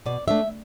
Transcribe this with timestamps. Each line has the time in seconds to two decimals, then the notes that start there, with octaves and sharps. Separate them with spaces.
0.06 B2 D5
0.28 A3 D4 E5